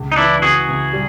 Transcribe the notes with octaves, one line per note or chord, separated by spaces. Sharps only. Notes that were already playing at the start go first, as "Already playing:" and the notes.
Already playing: C#2
D#4
E3 D4 E4
C#2 F#4 G#4
C#2
G3